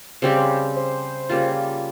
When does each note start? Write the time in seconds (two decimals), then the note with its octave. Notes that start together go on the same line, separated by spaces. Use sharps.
0.22 C#3 G3 C4 G4 C5
0.36 C5
0.49 C5
0.76 C5
1.29 C#3 G3 A#3 F4